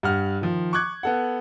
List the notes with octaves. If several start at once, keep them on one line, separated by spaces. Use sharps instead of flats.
G2 F#5 F6
D#3 F3
C#6 D6 F#6 G#6
B3 A4 F#5